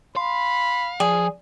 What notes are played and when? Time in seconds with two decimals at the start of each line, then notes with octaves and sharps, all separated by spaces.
0.16 F5 B5 C6
1.00 F3 G#4 D5